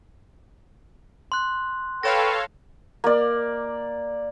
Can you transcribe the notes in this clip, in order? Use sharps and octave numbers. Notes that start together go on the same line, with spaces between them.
C6 F#6
A4 B4 C#5 F5 G5 C#6 A#6 E7
A#3 D5